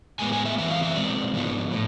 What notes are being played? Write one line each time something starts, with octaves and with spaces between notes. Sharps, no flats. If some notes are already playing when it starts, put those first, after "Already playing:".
A2 G#3 B3 G#5
G#5
E5
F2 E3 A3 C4 E5
F5
E5
B2 G#3 C4 D5
G#2 F3 B3 D4
A2